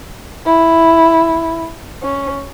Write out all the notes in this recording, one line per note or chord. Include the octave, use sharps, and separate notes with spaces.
E4
C#4